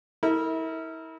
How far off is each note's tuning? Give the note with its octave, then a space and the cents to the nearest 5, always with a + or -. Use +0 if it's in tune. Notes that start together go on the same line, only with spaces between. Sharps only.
E4 -35 A#4 -25